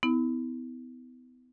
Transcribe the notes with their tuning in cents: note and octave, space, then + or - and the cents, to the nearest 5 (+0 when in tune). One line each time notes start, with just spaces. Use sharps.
B3 +30 E4 -35